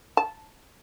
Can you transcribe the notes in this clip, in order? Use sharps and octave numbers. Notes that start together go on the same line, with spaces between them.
A5